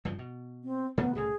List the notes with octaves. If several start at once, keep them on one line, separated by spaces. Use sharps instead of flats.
G2 C#3 F3
B2
C4
C3 D#3 A3 B3
C2 A2 C#3 G#4